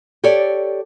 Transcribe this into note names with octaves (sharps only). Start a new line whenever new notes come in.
G4 A4 C#5 D5